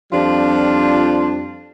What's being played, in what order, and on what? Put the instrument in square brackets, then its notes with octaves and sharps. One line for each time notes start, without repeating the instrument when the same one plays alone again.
[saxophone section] F2 F3 G3 D4 F4 C5